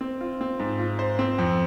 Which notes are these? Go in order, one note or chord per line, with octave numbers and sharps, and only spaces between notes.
C4
F4
C4
G#2
F4
C5
C4
F2